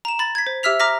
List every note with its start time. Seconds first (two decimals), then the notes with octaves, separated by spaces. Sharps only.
0.05 A#5 E7
0.19 B5 A6
0.35 G#6 B6
0.47 C5
0.63 G4 E5 E6 F6 B6 F7
0.80 A#5 D6 F6 A#6 B6